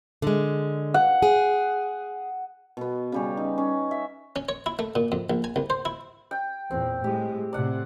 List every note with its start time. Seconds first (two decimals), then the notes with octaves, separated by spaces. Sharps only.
0.22 D3 G#3
0.94 F#5
1.22 G#4
2.77 B2 B3
3.12 C#3 G3 C#4
3.37 D#4
3.58 C#4
3.91 E5
4.36 C#4
4.49 C#5
4.66 E4
4.79 A3
4.95 A#2
5.12 F2
5.30 A#1
5.44 G#5
5.56 C2
5.70 C5
5.85 E4
6.31 G5
6.71 E2 A#2 C4
7.04 A2 G#3 G4
7.53 A2 C3 D5 F#5